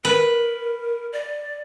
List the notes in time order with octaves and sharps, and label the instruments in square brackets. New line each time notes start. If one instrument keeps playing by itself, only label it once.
[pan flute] A#4 [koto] B4
[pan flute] D5